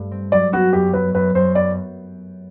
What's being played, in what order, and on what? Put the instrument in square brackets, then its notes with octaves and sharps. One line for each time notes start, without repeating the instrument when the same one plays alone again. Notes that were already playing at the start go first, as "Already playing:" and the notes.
Already playing: [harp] G2 A3
C4
[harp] F#3 [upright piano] D5
[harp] B3 [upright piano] F#4
[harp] F#2 [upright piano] G4
[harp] F#3 [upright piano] B4
[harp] F#2 [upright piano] B4
[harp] F#2 [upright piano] C5
[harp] B3 [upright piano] D5